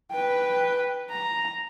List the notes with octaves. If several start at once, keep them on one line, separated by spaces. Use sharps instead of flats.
B4 G5
A#5